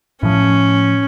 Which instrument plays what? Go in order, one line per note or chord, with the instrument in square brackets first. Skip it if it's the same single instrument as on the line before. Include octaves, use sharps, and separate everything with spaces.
[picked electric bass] A2 F3 [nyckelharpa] C#4